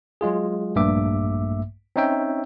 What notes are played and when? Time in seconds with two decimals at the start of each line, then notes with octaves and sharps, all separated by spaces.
0.21 F#3 G#3 F4 G#4
0.76 A#1 G2 A3 A#3 E5 D6
1.96 C4 C#4 D#4 C#5 E5 G5